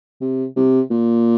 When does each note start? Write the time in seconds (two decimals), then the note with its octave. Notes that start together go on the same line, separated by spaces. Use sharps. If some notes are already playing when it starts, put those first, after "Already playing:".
0.21 C3
0.56 C3
0.91 A#2